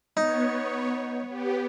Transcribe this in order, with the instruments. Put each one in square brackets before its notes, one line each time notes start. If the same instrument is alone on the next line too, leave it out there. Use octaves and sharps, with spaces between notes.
[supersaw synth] B3 C#5 [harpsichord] D#4
[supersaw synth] B3 G4